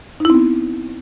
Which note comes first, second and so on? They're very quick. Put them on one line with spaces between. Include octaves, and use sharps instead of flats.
D#4 E4 C4 B3